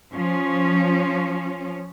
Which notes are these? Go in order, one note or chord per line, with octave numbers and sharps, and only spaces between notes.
F3 C#4